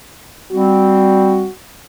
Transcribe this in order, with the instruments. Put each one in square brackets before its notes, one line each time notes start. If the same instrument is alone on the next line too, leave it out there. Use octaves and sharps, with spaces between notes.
[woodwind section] G3 C4 [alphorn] F#4